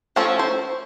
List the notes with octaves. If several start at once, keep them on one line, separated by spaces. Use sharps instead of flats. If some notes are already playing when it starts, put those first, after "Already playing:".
F3 A3 C#4 A4
C5